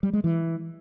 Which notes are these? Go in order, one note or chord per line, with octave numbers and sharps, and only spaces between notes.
G3
G#3
E3